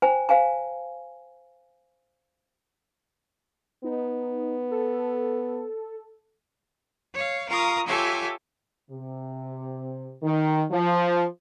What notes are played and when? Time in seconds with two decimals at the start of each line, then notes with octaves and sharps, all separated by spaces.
0.02 C5 G5 G#5 A#5
0.29 C5 F5 G#5 A#5
3.84 B3 D#4
4.71 A4
7.16 C#5 F5
7.50 F4 A#4 F5 A#5 C#6 D#6
7.87 F4 G4 A4 C#5 E5 G#5
8.90 C3
10.23 D#3
10.71 F3